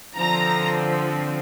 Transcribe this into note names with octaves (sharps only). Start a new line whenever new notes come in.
D3 F3 C4 A#5